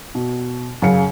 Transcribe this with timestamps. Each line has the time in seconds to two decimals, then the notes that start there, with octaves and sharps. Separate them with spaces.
0.15 B2
0.82 F#2 C#3 F5 C#7